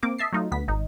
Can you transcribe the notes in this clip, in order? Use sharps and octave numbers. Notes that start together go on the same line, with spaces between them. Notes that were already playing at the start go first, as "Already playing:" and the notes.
A#3 C4 D6
D#5 E5 A5 C7
F#3 A3 D#4 F4
D2 B3 B6
G#1 D#4